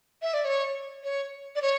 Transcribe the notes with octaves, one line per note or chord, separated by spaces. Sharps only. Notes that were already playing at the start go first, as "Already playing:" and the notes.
E5
D5
C#5
C#5
D5
C#5